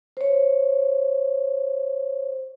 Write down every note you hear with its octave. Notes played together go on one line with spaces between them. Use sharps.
C5 C#5